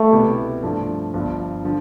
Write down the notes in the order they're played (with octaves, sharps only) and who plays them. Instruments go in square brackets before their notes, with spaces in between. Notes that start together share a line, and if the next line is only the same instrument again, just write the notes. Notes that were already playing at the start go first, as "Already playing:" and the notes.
Already playing: [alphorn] A3
[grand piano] C2 B2 B3 E4 G4
G2 F3 A3 D4
G1 G2 F3
D3 F3